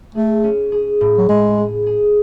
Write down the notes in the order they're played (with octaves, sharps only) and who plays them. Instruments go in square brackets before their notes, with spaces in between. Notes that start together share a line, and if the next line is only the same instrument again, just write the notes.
[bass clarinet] A3 [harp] G#4
[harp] C#4
G#4
A2
[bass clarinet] F#3
[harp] A2 [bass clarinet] G#3
[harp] G#4
G#4